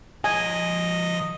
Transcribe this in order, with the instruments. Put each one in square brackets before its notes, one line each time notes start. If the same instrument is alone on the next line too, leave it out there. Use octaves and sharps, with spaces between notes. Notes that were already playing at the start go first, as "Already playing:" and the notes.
[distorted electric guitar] F3 C#5 [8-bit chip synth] D#5 [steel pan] G#5